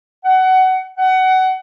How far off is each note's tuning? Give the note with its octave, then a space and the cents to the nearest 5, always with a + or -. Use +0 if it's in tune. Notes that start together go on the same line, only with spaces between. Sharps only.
F#5 +20
F#5 +20